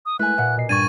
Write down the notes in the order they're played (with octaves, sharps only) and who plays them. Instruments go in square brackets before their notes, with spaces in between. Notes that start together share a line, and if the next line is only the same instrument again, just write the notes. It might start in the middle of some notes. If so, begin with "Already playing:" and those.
[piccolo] D#6
[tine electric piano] G#3 A3 E4 [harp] B4 G#5 [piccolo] F#6
[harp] A#2 [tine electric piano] E5 F#5
[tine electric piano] B2 D#5 C7
[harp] G2 [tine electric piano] G3 D4 [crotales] C#6 A6 D#7 [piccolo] G#6